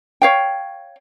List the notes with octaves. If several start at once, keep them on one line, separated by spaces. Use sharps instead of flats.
C#5 F5 G5